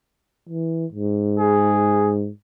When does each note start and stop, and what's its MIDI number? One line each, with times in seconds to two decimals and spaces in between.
0.49 0.86 52
0.93 2.30 44
1.39 2.13 68